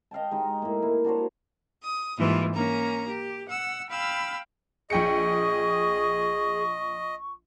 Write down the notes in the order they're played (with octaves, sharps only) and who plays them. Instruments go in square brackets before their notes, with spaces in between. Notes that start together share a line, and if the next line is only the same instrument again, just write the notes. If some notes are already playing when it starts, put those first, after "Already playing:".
[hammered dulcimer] D#5 F5 G5 A5
G#3 D#4 G4
A2 A#3
A#3 E4
D4 F#4 C5 C#5
[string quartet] D#6
G#2 E3 G3 A#3 F4
A#3 C#4 A#5
G4
F#5 E6
F5 G5 B5 E6
[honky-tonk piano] A#1 G5 C#7 [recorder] G#4 [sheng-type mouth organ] D#5 [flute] C#6